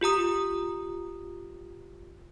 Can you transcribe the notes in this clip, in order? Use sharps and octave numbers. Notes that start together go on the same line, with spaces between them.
F4 G4 A#5 D#6